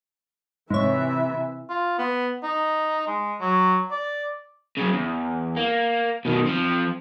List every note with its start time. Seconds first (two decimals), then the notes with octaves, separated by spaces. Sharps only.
0.70 G#2 C3 E3 C#5 E5
1.69 F4
1.99 B3
2.43 D#4
3.07 G#3
3.41 F#3
3.91 D5
4.77 F#2 C#3
4.93 E2
5.57 A#3
6.25 B2 D#3
6.46 F3 C4